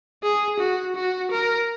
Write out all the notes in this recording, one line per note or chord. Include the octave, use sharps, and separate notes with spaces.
G#4
F#4
F#4
A#4